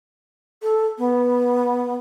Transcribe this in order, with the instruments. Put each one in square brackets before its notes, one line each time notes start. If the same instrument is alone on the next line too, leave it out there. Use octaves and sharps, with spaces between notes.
[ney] A4
B3